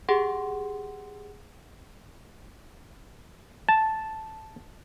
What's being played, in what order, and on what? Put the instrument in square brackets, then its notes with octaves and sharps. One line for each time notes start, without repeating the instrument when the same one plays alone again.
[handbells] G4 G#4 F#5 C6
[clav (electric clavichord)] A5